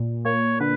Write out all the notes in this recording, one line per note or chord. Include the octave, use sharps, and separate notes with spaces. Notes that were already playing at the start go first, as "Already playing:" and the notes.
Already playing: A#2
A#3 C#5
D3 B4